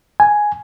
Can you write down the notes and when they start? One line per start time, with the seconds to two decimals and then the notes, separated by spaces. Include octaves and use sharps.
0.20 G#5